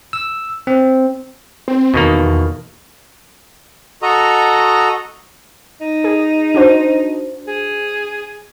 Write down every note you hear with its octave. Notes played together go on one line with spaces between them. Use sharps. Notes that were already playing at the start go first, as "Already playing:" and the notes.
E6
C4
C4
E2 B2 D#3 A#3
F#4 A4 D#5 A#5
D#4
G#4
D4 F#4 C5
G#4